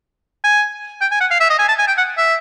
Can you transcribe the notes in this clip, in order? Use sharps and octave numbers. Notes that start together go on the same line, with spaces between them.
G#5
G5
G#5
F#5
F5
E5
D#5
G#5
A5
G#5
G5
F#5
E5